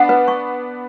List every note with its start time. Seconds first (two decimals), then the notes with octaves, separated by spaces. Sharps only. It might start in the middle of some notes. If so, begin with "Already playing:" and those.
Already playing: B3 D4 F#5
0.09 B4
0.28 C#6